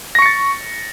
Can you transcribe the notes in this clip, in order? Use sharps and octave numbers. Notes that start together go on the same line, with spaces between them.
C#6 A6 A#6 C#7